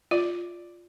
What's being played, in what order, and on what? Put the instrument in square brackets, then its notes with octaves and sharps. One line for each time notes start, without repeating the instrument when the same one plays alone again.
[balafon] F4 [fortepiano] D5